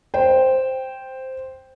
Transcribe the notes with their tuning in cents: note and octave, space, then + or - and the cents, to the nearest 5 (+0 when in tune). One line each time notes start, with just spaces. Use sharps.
C5 +0 G5 +0